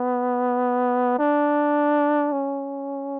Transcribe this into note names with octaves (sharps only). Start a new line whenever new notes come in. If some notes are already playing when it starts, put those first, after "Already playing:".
Already playing: B3
D4
C#4